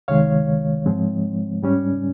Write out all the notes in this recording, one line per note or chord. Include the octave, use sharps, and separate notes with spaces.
C#2 C3 D#3 G#3 C#5 F5
G#2 F3 G#3 C4
G#2 G3 C#4